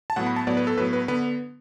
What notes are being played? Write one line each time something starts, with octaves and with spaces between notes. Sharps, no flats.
A5
A2 F#3 B3 F#5
B5
A5
A2 F#3 B3 D5
B4
A4
A2 F#3 B3 B4
B4
D3 B3 B4